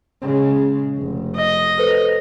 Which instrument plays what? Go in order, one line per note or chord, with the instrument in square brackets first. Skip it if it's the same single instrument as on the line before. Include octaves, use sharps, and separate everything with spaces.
[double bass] C#3 G#3
F1
[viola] D#5
[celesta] A4 B4 C5